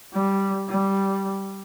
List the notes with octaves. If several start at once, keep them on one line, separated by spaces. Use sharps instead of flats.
G3
G3